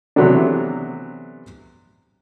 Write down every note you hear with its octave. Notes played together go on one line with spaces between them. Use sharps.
C3 E3 F#3 A3 B3 D4